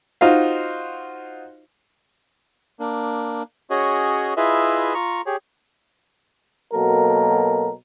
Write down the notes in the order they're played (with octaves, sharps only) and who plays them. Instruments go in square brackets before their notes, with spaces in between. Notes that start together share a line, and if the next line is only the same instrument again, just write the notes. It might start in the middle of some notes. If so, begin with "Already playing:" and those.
[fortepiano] D#4 F4 F#4 C5 D#5 F5
[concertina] A#3 D4
C#4 F#4 G#4 C#5 D#5
E4 F4 G#4 B4 D#5 E5
F4 A#5 C#6
G4 G#4 C#5
[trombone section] B2 F#3 A#3 A4 A#4